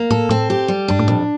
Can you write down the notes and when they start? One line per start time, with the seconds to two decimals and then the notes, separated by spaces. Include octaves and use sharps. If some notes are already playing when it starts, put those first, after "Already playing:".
Already playing: A#3
0.11 A2 A4
0.29 A2 C4
0.50 G4
0.68 G3
0.88 G2 D4
0.99 A2
1.08 F2 A#2